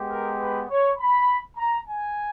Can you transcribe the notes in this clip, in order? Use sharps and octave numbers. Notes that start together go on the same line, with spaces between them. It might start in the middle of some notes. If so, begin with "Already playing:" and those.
Already playing: G#3 B3 G4
A#4
B4
C#5
B5
A#5
G#5